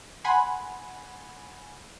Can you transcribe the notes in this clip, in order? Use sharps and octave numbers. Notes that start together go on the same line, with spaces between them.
F#5 G#5 B5 C6